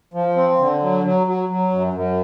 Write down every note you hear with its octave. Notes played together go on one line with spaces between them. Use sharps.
F3
C4
D3
F#3
F#3
F#3
F#3
F#2
F#2